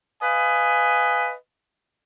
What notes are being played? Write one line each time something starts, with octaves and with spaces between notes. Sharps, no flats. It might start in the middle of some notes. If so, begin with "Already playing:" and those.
B4 D#5 F5 G#5